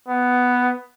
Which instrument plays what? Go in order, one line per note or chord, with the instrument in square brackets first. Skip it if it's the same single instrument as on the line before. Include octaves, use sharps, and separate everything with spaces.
[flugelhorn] B3